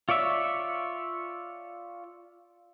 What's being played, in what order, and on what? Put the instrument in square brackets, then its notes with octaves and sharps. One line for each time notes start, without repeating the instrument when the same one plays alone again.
[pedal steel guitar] F4 C#5 D5 E5